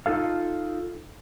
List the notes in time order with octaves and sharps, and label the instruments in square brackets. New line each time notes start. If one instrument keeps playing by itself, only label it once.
[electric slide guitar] D#4 F4 A4 F5